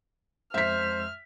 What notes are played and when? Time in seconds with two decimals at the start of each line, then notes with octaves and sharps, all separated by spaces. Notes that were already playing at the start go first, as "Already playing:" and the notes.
0.54 F2 G#3 C5 E5 F6 B6